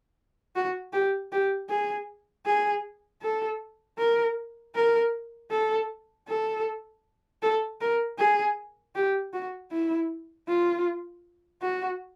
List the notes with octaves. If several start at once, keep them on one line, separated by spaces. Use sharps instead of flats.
F#4
G4
G4
G#4
G#4
A4
A#4
A#4
A4
A4
A4
A#4
G#4
G4
F#4
E4
F4
F#4